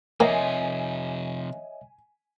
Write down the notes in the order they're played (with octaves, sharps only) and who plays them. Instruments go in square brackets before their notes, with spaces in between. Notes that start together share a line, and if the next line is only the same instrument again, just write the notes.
[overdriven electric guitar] C3 F3 [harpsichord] A#3 [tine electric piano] C#5 D#5 E5 [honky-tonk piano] G#5